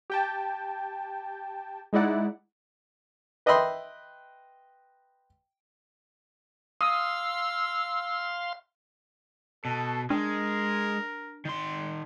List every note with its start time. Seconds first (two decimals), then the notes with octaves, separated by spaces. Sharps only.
0.10 G4 G5 A5
1.93 G#3 D#4 E4 D5 F#5
3.46 B4 D#5 E5 G5 B5 C6
6.81 F5 C6 D#6 E6
9.65 B2 A4
10.10 G#3 D4 A#4
11.45 D#3 C6